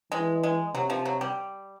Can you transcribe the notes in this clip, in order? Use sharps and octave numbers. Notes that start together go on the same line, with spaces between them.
E3 G#3
G#3
C3 F#3
F3
F#3
G3